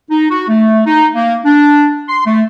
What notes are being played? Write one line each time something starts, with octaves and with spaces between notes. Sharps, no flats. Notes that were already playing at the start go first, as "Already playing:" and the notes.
D#4
F#4
A3
D#4
A#3
D4
C6
A3